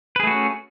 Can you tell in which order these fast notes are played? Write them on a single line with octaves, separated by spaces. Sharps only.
B4 G#4 A3 F#4 C#4